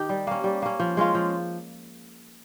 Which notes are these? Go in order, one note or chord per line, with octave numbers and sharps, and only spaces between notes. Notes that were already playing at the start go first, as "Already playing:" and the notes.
Already playing: D#3 D#4 G4
G3
A#3 C#4
G3
A#3 C#4
F3
G#3 C#4 F4
F3